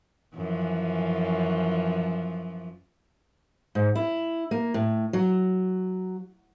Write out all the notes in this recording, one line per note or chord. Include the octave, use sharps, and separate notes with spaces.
F#2 E3 F3
G#2
E4
A#3
A2
F#3